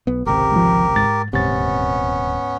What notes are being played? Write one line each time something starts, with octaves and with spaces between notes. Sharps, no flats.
B1 B3
G#1 C#2 C3 G4 A#4
G#2 F3
G#2 A6
D#1 D2 G#2 C3 B3 C#4 A6